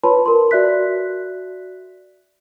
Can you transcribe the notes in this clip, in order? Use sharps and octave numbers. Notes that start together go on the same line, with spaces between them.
F4 B4 C#5 A5 B5 C6
A#4 C6
F#4 D5 E5 F#6 B6